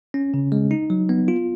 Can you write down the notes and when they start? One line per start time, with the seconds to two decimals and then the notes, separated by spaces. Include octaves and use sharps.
0.14 C#4
0.34 C#3
0.52 G#3
0.71 D#4
0.90 F#3
1.09 B3
1.28 F4